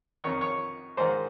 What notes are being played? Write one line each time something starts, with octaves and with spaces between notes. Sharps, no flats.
F2 D#3 C#5
C#5
G#2 D#3 C5